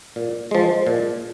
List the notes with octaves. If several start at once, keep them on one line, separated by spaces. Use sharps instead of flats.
A#2
F3 G#3
A#2